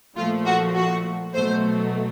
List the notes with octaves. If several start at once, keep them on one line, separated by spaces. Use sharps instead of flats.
A#2 F3 A3 F4
F#4
F#4
B2 F#3 A3 C5